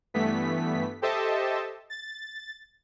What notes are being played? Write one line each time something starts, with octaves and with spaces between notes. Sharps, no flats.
G2 E3 A3 B3 B6
G4 A4 C5 D#5 E5 A5
A6